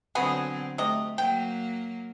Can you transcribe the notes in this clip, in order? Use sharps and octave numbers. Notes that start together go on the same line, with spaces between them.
D3 F#3 B3 C4 F#4 G#4
C3 A3 D#5
F#3 A#3 G5